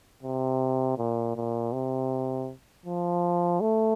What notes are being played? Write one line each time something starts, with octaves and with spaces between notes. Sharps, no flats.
C3
A#2
A#2
C3
F3
A3